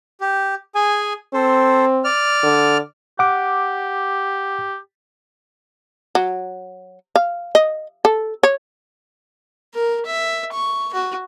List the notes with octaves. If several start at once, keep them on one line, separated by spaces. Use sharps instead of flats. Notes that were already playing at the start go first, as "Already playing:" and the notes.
G4
G#4 G#5
C4 A4 C5
D5 F6
D3
G4 F#5 D6
F#3
F5
D#5
A4
C#5
A#4
E5
C#6
F#4